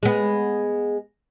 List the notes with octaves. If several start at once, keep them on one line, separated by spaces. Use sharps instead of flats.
G#3 B3